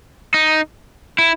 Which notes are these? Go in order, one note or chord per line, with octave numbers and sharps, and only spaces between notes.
D#4
E4